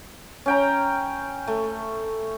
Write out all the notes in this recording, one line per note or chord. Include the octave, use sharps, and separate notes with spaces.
C#4 G5 A#5
A3